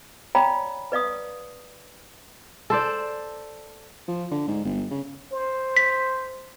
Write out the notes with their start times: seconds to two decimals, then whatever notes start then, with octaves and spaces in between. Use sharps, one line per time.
0.35 C#5 D5 F5 G5 A#5 B5
0.92 B4 D5 F5 D#6
2.70 A4 C5 D5
4.08 F3
4.31 D3
4.48 G#2
4.65 G1
4.91 C#3
5.33 C5
5.77 B6